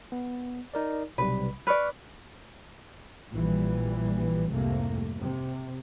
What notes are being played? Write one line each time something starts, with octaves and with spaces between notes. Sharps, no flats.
B3
D#4 A#4 D5
B1 C3 G3 B4
B4 D5 C#6 F6 F#6
A#1 A#2 E3 G3
C2 F2 G#2 C3 A3 A#3
C3